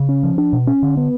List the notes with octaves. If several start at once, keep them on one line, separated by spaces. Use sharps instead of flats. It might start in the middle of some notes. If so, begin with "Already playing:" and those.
Already playing: C#3
C#4
F3
D4
B2
C#4
D3
B3